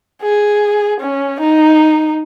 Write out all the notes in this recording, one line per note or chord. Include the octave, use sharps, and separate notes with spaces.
G#4
C#4
D#4